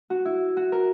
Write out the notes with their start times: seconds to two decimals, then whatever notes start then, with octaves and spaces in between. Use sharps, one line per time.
0.10 F#4
0.25 E4
0.57 F#4
0.72 A#4